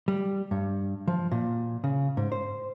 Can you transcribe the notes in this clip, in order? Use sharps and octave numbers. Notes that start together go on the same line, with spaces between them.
G3
G2
F3
A#2
C#3
G#2
C5